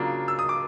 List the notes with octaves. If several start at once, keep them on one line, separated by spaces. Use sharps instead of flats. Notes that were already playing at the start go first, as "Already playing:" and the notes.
Already playing: C#3 F#3 A#3 D4 F4
E6
D#6
D6